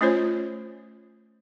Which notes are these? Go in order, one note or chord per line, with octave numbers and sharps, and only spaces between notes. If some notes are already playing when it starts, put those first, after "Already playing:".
A3 C#4 F4 C5 C#5